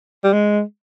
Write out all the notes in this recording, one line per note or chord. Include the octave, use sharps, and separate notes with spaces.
G3
G#3